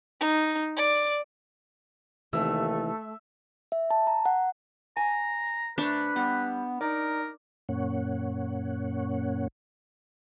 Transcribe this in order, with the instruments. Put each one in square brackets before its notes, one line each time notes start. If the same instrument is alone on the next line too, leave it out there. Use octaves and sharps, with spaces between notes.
[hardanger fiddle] D#4
D5
[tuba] D#2 [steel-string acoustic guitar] C3 D#3 E3 [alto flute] A3 [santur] E5
[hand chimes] E5
A5
A#5
F#5
[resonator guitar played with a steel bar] G#5 [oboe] A#5
[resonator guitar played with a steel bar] C3 A3 [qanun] D4 [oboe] B4
[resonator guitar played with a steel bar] G3 [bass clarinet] B3
[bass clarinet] D#4 [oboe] A#4 [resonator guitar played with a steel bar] D5
[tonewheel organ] F#2 A#2 A#3 C#4 C#5 F#5